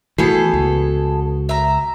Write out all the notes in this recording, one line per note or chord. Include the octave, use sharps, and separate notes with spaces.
E3 A3 B3 F#4 G#4 A4
C#2
E5 A#5